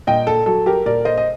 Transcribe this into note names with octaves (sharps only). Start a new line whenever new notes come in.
A#2 D#5 G5
A4
F#3 A4
G4 A#4
A#2 A#4 D5
C5 D#5
D#5